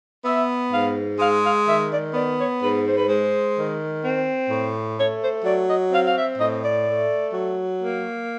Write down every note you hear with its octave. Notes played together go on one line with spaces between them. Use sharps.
B3 E5
G#2 F5
G#3 F5
F5
D#3 E5
D5
B3 D5
C#5
G#2 B4
C5
B4
G#3 C5
D#3
C4
A2
A3 C#5
C5
F#3 D5
D#5
C4 F5
F5
E5
A2 D#5
D5
A3
F#3
A#3